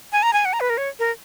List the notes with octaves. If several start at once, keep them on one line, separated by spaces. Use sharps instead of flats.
G#5
A#5
G#5
F#5
A#5
B4
A#4
C#5
A#4